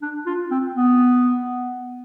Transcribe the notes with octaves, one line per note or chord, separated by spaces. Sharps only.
D4
F4
C4
B3